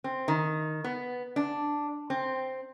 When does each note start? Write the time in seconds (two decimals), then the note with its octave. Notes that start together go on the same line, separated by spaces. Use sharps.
0.04 C4
0.28 D#3
0.84 B3
1.36 D4
2.10 C4